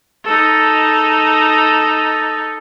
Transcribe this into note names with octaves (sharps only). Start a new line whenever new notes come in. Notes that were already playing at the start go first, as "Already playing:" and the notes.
D#4 A4